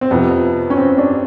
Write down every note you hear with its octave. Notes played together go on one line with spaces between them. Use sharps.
C4
F2 C3 F3 B3
C#4
C4
D4